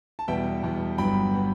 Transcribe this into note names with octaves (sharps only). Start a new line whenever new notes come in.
A5
E2 B2 G3 B3 E5 G5
E2 B2 G3 B3
G1 G2 F#3 B3 G5 B5
F#3 B3